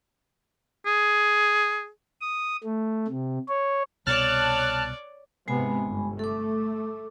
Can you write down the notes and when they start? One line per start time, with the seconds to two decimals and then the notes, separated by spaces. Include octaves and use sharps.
0.86 G#4
2.21 D#6
2.64 A3
3.08 C3
3.48 C#5
4.06 C2 B2 C#5 D5 A5 F6 F#6
5.48 G#2 C3 G#3 B3 G#5 B5
5.86 G1
6.19 A3 A4 D6